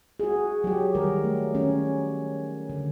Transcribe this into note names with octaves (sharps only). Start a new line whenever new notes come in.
F#4 G#4
F#3 G4
D#3 G3 A#4
A3
D#3 C#4
D3